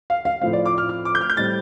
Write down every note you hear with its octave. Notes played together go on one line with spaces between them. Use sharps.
F5
F5
A2 F3 A3 C4 F5
D5
D6
F6
F6
D6
G6
F6
G6
A2 G3 C4 A6